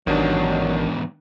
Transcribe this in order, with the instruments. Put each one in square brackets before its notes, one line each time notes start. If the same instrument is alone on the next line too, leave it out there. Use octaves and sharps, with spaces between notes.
[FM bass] A1 [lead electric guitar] E2 G#2 [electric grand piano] D#3 D4 [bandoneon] F#3